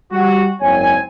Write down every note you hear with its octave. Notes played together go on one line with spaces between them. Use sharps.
G3 F#4
F#1 G#2 A#3 C4 C#5 G#5